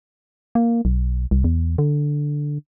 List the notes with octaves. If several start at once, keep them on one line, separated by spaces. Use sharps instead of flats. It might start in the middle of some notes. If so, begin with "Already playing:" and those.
A#3
B1
C2
E2
D3